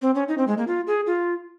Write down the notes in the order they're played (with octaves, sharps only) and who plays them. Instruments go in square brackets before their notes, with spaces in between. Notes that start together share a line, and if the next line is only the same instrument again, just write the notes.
[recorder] C4
C#4
D#4
C4
G#3
A#3
F4
G#4
F4